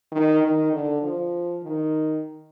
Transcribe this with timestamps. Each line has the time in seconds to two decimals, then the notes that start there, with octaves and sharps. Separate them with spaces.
0.12 D#3
0.42 D#3
0.72 D3
1.03 F3
1.63 D#3